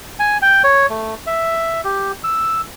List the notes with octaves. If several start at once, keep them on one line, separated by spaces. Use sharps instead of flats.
G#5
G5
C#5
A3
E5
G4
E6